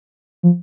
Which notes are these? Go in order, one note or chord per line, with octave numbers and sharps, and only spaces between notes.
F3